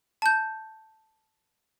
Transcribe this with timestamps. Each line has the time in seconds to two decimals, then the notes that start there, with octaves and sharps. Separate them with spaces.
0.22 A5 G6